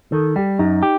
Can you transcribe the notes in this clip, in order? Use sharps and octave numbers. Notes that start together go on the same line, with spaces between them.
D#3 A4
G3 G4
F#2 D#4
G4